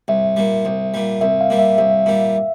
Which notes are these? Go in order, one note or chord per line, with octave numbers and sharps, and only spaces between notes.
C2 E5
A#2 G3
C2
A#2 G3
C2 E5
F5
A#2 G3
E5
C2 E5
A#2 G3